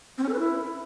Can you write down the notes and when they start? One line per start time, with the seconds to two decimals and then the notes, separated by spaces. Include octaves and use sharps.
0.18 C4
0.23 C#4
0.28 A4
0.34 B4
0.39 E4